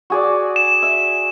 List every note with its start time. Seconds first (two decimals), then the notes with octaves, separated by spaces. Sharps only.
0.10 F#4 G#4 D5
0.56 E7
0.82 E5